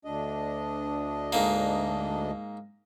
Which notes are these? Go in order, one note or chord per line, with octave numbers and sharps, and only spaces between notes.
D2 D4 D#5
G#2 A#3